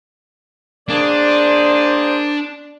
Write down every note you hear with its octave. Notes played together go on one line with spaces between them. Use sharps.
A#3 D4 G#4 C5 D5